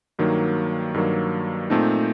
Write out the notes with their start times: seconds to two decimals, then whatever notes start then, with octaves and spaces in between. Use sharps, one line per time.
0.19 G2 D#3 F#3 A#3
0.94 G2 D#3 F#3 A#3
1.70 A#2 A3 C4 D#4 A5